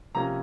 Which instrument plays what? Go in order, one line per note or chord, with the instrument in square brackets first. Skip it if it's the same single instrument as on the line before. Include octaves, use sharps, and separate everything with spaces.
[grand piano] C3 F3 A#3 C#4 A#5